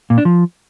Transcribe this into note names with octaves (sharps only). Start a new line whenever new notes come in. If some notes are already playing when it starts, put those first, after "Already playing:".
A#2
D4
F3